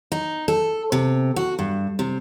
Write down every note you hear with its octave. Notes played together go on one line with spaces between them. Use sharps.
D#4
A4
C3
F#4
G2
C3